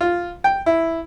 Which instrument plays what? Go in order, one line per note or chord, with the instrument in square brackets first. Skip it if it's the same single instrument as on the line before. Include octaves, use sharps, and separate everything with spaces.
[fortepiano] F4
G5
E4